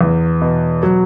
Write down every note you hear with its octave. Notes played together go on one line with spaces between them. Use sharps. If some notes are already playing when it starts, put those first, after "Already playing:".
E2
B2
F#3